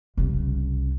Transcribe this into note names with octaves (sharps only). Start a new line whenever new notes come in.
C2 C#3